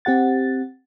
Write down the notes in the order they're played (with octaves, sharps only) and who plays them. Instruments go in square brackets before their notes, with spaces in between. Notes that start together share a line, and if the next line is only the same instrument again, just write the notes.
[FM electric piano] C4 G4 F#5 A6